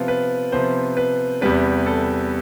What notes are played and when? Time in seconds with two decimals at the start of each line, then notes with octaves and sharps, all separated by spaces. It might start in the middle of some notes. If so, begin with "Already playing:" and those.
Already playing: C3 F3 B3 F4
0.08 B4
0.52 C3 F3 B3 C5
0.97 B4
1.41 E2 C3 G3 B3 B4
1.86 A4